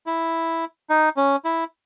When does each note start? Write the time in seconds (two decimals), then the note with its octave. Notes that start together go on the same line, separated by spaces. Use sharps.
0.06 E4
0.90 D#4
1.17 C#4
1.45 E4